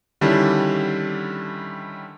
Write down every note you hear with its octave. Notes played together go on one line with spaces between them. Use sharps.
D3 D#3 G3 C#4 D4 E4